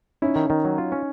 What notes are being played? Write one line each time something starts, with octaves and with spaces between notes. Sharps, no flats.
C#4 D#4 E4
D#3
D#3
F#3
F4
C#4